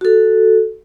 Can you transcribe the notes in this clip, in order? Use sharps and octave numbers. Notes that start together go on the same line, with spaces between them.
F#4 A4